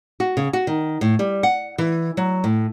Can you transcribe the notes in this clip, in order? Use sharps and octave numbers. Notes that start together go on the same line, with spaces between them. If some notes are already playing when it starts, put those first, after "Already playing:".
F#4
C#3
F#4
D#3
A2
G3
F#5
E3
F#3
A2